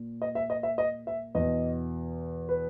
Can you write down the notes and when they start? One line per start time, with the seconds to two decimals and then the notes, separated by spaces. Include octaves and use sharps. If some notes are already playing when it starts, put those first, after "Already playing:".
Already playing: A#2
0.22 D#5
0.35 E5
0.50 D#5
0.63 E5
0.78 D#5
1.07 E5
1.35 E2 B2 D#5
2.49 B4